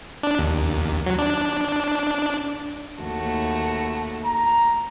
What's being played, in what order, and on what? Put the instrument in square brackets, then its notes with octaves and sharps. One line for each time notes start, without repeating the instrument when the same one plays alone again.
[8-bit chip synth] D4
D#2
F#3
D4
[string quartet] D#2 A3 F#4
[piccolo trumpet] A#5